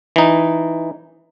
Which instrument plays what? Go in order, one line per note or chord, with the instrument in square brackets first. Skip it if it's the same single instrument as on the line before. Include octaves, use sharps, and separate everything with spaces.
[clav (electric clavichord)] E3 D#4